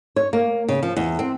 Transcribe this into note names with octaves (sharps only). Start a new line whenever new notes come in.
C#5
A#3
C#3
F3
E2
C4